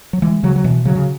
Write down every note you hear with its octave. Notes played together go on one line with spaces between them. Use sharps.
F#3
E3 G#3
C#3 F#3
F#3
B2 E3
C#3 F#3
C#3